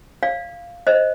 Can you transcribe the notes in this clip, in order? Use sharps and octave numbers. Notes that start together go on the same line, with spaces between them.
D5 F5
C5 D#5